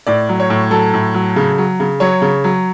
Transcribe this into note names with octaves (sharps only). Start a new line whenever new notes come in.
A2 D5
F#3
C#5
A2
F#3 A4
A2
F#3
C#3
F#3
C#3
F#3 C#5
C#3
F#3